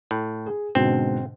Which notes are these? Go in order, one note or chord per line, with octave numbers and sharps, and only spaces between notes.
A2
G#4
G#2 B2 D3 C4